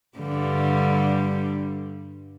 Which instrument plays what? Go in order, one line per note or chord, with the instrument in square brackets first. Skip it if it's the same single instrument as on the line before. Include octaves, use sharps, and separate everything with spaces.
[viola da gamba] G2 D3 G3